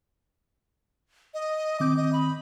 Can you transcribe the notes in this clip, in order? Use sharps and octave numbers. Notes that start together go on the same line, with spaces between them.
D#5
D#3 C4 D6 G6
D#5
B5